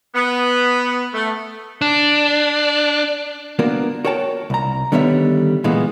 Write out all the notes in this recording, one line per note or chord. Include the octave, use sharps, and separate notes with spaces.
B3
A3
D4
A#3 B3 D4 F#4 A#4
F#4 A#4 C#5 G5 A5
C2 A#5
D3 D#3 G3 B3 C#5 E5
A#2 E3 G#3 B3